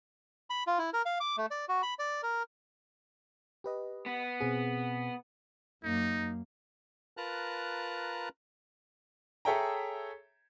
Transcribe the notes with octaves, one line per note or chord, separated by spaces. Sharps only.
B5
F4
E4
A#4
F5
D6
A3
D5
F#4
B5
D5
A#4
G4 B4 D#5
B3
B2 C4 G#4
F#2 A#3 D#4
F4 A#4 B4 A5 A#5 F#6
G#4 A4 C#5 E5 G5 A#5